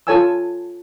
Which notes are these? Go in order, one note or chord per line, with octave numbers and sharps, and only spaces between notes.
F4 A4 C#5 G#5 A5 E6